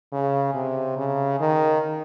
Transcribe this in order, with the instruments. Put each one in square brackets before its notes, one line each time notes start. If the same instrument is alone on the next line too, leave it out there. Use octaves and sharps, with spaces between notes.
[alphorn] C#3
C3
C#3
D#3